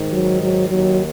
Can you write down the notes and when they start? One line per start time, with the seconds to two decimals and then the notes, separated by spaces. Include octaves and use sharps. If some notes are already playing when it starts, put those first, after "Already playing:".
Already playing: G#2 D#3
0.13 F#3
0.42 F#3
0.70 D#2 D#3 F#3